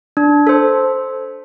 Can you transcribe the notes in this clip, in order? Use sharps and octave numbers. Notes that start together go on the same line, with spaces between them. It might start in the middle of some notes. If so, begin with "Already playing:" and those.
D4
A4 C5